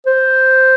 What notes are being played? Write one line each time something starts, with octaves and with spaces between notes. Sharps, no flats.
C5